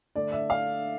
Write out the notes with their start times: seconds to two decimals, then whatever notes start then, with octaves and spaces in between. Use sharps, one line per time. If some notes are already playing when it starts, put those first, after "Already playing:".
0.15 D3 A3 D4 D5
0.32 E5
0.50 F5